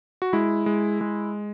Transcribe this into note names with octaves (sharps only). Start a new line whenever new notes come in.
F#4
G#3 E4
G#3
G#3